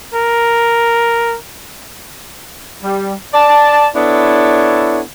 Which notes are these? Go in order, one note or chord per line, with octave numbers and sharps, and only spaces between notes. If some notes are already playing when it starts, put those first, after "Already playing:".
A#4
G3
D5 A5
B3 D4 E4 A4 C#5